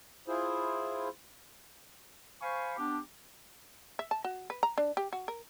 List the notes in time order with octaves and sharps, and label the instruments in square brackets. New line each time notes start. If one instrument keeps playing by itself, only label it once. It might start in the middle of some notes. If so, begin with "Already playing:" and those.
[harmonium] E4 F4 G#4 C5
[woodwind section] C5 F5 G#5 B5 C#6
B3 D4 G4
[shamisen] E5
A5
F#4
B4
A#5
D4
G4
F#4
A#4